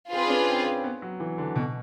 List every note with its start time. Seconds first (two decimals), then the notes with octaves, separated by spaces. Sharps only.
0.12 C4 F4 G#4 B4
0.26 D4
0.30 C#4
0.48 C4
0.66 C4
0.84 B3
1.02 F#3
1.20 E3
1.38 D3
1.56 B2